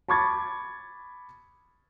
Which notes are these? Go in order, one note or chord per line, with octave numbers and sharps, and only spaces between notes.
A5 B5 C#6 D6 G#6 A6